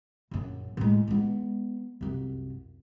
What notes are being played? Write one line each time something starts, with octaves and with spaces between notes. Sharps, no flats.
A#1 F#2
A2 G#3
G#3 B3
C2 F#2